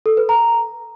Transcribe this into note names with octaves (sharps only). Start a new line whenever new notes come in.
A4
B4
A#5